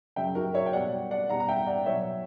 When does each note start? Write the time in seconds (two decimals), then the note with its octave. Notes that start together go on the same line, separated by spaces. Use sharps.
0.16 F#2 C#3 F#3 E5 G5
0.35 F#4 A#4
0.54 C#5 E5
0.66 G5
0.73 B2 G3 D5 F#5
1.11 D5 F#5
1.29 B2 G3 F#5 A#5
1.40 A#5
1.49 E5 G5
1.67 D5 F#5
1.86 B2 F#3 C#5 E5